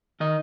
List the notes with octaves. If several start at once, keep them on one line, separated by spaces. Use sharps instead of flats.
D#3 D#5